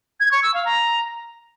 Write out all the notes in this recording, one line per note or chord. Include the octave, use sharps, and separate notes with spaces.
G#6
C#6
E6
F5
A#5